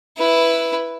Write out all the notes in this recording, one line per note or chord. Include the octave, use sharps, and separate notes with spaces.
E4 B4